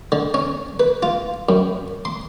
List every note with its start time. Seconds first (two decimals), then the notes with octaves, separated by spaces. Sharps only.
0.12 D3
0.34 C#4
0.80 B4
1.03 F4
1.49 F#2
2.05 C6